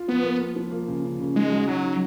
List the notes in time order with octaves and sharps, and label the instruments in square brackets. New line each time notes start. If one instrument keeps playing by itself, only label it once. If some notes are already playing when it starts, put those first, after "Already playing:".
Already playing: [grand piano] F4
[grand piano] F3 [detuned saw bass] B3
[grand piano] A#3
A#3
F3
A#3
C#3
C#3
C#3
[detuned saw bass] G#3 [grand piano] D#4
[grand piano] F#3
[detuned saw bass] F#3 [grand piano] D#4
[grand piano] D#4